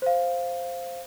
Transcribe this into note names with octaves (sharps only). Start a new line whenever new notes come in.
C5 F5